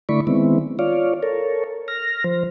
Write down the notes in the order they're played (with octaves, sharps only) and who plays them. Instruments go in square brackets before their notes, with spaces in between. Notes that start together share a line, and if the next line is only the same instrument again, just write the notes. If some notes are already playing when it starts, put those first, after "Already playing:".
[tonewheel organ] D3 A3 E4 D5 B5 C#6
D#3 G#3 B3 C4 E4
F4 C#5 D5 F5
A4 A#4 C#5
F6 A#6
F3 C5